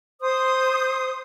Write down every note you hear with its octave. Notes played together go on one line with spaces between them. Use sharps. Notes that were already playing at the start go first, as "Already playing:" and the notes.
C5 D#6